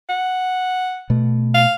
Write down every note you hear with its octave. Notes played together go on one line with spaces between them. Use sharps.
F#5
B2 A3
F5